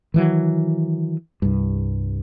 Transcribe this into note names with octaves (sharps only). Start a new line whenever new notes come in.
D#3 E3 F#3
C2 G2